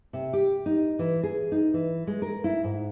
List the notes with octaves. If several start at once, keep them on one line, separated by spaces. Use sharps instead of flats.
C3
G4
D#4
E3
G#4
D#4
E3
G#3
A#4
E4
G#2